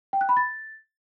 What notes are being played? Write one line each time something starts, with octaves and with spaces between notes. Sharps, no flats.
G5
F#6
B5
A6